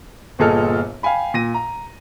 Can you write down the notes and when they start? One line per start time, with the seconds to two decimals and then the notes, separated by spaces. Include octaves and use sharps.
0.39 G1 A#2 G#4 A4 D#5 F6
1.03 F5 G5 G#5 B5
1.34 A#2 A#6 D#7
1.54 A#5